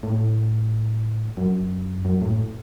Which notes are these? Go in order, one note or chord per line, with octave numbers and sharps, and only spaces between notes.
A2
F#2
F#2
A2